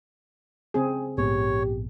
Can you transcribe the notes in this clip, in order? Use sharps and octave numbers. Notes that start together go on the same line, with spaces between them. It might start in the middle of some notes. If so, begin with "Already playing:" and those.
C#3 C4 G#4
A#1 G#2 B3 G4 C#5